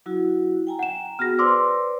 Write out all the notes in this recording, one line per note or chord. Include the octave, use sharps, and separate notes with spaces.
F#3 E4 F#4
G5 G#5 A#5
F#5 E7
B3 F#4 G#4 F6 A#6
B4 C5 D5 C6 D6 E6